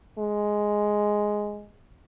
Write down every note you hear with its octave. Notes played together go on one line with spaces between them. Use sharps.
G#3